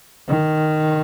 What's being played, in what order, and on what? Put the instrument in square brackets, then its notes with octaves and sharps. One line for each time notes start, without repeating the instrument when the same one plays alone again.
[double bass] D#3